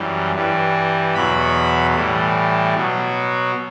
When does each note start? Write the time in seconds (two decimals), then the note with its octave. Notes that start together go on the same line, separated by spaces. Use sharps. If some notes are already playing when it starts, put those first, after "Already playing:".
Already playing: F#2 E3 G3
0.34 G2 E3 G3
1.15 E2 B2 F#3 B5
1.95 A2 E3 G3
2.74 B2 F#3